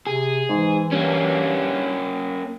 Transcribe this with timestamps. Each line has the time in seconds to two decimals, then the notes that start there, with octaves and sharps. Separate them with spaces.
0.07 C3 G#4
0.49 G#2 E3
0.92 G2 A#3 C#4